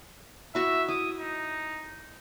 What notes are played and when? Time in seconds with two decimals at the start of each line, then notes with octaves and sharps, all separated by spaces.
0.55 E4 F#4 E5 C#6
0.88 E4 D6 D#6
1.20 D#4